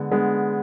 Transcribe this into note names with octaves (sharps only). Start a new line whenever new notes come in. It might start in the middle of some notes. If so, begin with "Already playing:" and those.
Already playing: D3 G#3 B3
D3 G#3 B3